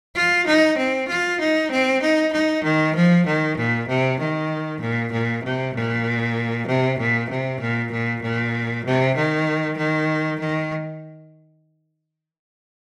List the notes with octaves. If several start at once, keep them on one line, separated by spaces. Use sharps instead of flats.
F4
D#4
C4
F4
D#4
C4
D#4
D#4
D#3
F3
D#3
A#2
C3
D#3
A#2
A#2
C3
A#2
C3
A#2
C3
A#2
A#2
A#2
C3
D#3
D#3
D#3